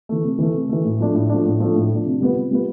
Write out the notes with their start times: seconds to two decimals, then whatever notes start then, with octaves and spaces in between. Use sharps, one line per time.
0.09 E3 A3
0.24 C3
0.38 E3 A3
0.54 C3
0.69 E3 A3
0.85 A2
0.99 F3 A3 D4
1.14 A2
1.29 F3 A3 D4
1.46 A2
1.60 F3 A3 D4
1.76 A2
1.91 F3 A3 D4
2.06 C3
2.21 G3 B3 F4 B4
2.36 C3
2.51 G3 B3 F4 B4